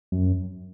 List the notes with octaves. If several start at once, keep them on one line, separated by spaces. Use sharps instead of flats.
F#2